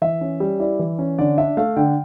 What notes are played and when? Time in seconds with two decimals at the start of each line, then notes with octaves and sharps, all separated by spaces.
0.02 E3 E5
0.21 C#4
0.40 G3
0.60 E4 D5
0.79 E3
0.99 C#4
1.18 D3 D5
1.38 D4 E5
1.57 A3 F5
1.77 D3 G5